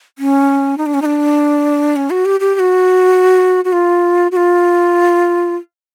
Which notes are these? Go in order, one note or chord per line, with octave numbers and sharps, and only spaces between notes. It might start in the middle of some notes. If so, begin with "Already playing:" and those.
C#4
D#4
D4
C#4
D#4
D4
C#4
F#4
G4
G4
G4
F#4
F#4
F4
F#4
F4